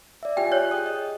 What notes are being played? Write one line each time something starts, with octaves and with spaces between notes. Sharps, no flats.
D5 E5
F4 G4 G5 G#5
C#5 F#6
G#4 G5 D#6
D#5